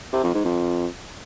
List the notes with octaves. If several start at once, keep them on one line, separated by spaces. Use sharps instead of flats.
C3
F2
G#2
F2